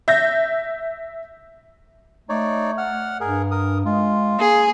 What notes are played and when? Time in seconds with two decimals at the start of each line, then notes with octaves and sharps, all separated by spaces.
0.08 E5 G6 A#6
2.29 A3 D#4 C#5 D5
2.78 F#5 F6
3.21 G2 G#4 A#4
3.51 A#4 D#6
3.86 G#3 F4
4.39 A#3 G#4